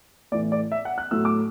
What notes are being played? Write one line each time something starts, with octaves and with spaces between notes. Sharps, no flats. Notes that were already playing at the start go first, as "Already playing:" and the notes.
A2 E3 A3 D5
D5
E5
F#5
F#6
A2 F#3 A3 E4 E6
D6